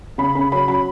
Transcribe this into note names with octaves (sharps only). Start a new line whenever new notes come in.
C#3 B5
C#3 B5
F#3 B5
F#3 B5